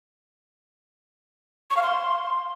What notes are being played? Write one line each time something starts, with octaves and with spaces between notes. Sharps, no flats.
C#6
F5
C6